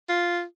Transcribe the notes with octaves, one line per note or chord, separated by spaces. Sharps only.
F4